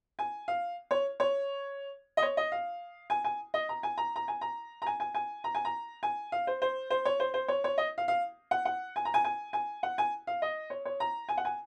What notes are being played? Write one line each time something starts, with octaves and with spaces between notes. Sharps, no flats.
G#5
F5
C#5
C#5
D#5
C#5
D#5
F5
G#5
G#5
D#5
A#5
G#5
A#5
A#5
G#5
A#5
A#5
G#5
G#5
G#5
A#5
G#5
A#5
G#5
F5
C5
C5
C5
C#5
C5
C5
C#5
C#5
D#5
F5
F5
F#5
F#5
G#5
A#5
G#5
G#5
G#5
F#5
G#5
F5
D#5
C#5
C#5
A#5
G#5
F#5
G#5